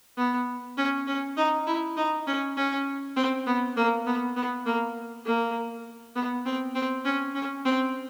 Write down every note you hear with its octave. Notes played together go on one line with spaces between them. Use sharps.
B3
C#4
C#4
D#4
E4
D#4
C#4
C#4
C4
B3
A#3
B3
B3
A#3
A#3
B3
C4
C4
C#4
C#4
C4